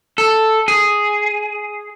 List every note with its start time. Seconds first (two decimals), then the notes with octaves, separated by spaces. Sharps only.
0.18 A4
0.68 G#4